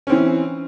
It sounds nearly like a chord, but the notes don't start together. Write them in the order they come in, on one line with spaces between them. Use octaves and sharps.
C#4 C4 E3